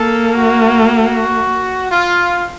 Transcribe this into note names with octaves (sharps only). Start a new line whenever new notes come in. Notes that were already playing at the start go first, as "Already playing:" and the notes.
Already playing: A#3 A4
F#4
F#4
F4